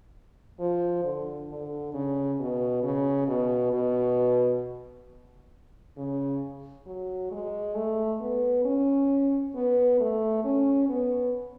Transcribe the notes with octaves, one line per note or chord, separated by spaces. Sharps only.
F3
D3
D3
C#3
B2
C#3
B2
B2
C#3
F#3
G#3
A3
B3
C#4
B3
A3
C#4
B3